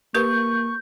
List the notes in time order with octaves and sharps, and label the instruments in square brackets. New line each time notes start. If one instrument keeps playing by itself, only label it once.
[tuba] A#3 [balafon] G4 A#4 B4 [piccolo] C#6 [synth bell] G6